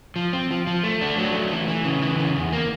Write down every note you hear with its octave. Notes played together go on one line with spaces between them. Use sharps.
F3
C4
F3
F3
A3
D4
F#3
A3
E3
E3
C#3
E3
C#3
E2
A#3